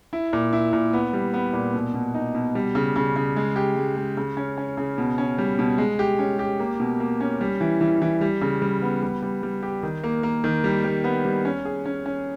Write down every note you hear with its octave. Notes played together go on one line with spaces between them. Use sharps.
E4
A#2
E4
A#2
B3
G3
B3
A#2
B2
B2
D#4
B2
G3
C#3
C#3
C#3
G#3
G4
G#3
G#3
C#3
C#4
C#4
C#3
B2
C#4
G3
B2
G#3
G4
C#4
G4
A#3
B2
A#3
C#4
G3
E3
E3
E3
G3
C#3
G3
B3
G3
G3
G3
G4
D#3
A#3
A#3
D#3
G3
G3
B3
G3
C#4
G#4
C#4
C#4